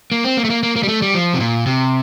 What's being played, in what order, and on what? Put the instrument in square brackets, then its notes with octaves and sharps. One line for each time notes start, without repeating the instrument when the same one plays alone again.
[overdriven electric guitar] A#3
C4
A#3
A3
A#3
A#3
A#3
G3
A3
G3
F3
C3
A#2
C3